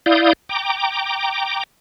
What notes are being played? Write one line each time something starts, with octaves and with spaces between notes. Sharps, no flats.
E4 D5 F5 D#6 G6
G5 A#5 D6